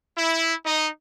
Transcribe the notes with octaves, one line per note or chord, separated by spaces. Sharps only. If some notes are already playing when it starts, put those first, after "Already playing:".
E4
D#4 D#5